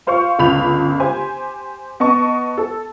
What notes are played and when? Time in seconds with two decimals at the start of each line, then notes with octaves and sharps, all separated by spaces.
0.07 F4 C5 F5 C6 C#6
0.39 G1 C#2 B5 G6 F7
1.00 G4 C5 G#5
2.00 B3 D#5 A5 C#6
2.58 A4